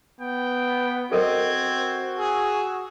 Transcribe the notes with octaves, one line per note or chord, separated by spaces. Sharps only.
B3 G5
C4 F#4 A4 A#4 D#5 G#6
G#4 E6